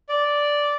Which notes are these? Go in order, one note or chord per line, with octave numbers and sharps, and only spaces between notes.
D5